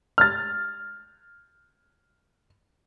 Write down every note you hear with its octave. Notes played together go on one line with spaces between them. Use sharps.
F6 A6